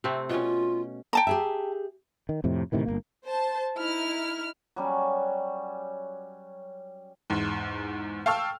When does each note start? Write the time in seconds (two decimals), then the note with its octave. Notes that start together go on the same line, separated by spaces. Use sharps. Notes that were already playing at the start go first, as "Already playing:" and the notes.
0.04 C3 A3 C4
0.29 B2 C#4 F4
1.13 G5 A5 A#5
1.27 G4 G#4 E5
2.29 D#3
2.44 F2 A2 C3
2.72 A2 C3 D#3 E3
2.85 G1 F2 A#3
3.26 C5 A5
3.78 D#4 E4 F6
4.76 F#3 G3 C#4
7.30 E2 G#2
8.26 F5 G5 A5 C#6 E6 F6